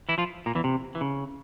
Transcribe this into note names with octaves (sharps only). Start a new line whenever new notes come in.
E3 E4
F3 F4
A#2 A#3
E2 E3
C3
E3
C#3